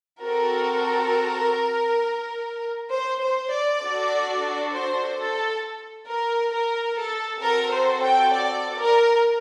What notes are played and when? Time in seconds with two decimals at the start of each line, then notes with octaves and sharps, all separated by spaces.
0.22 C4 F#4 A4 A#4
2.92 C5
3.22 C5
3.52 D5
3.82 D4 F#4 A4
4.72 C5
5.17 A4
6.08 A#4
6.53 A#4
6.98 A4
7.42 C4 F#4 A4 A#4
7.72 C5
8.03 G5
8.33 D5
8.77 A#4